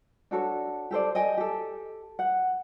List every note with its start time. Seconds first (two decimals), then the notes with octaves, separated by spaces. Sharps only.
0.31 D4 F#4 A4 C#5
0.91 G4 A4 C5 D5
1.15 D#5 G5 G#5
1.37 G4 A4
2.19 F#5